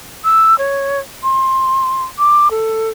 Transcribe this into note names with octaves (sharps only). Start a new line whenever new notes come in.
E6
C#5
C6
D6
A4